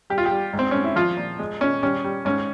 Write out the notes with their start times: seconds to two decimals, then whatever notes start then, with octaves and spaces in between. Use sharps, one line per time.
0.10 G3 G4
0.18 F4
0.26 G4
0.31 G3
0.53 G#2
0.59 C4
0.71 G#2 C#4
0.84 E4
0.96 F3 F4
1.17 A#2
1.39 G#3
1.61 A#2 C#4
1.83 G3 C#4
2.04 G3
2.25 G#2 C#4